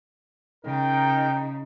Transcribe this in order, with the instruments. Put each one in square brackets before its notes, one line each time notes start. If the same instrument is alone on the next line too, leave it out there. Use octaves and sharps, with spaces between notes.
[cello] C#3 [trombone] D#4 [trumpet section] A#4 G5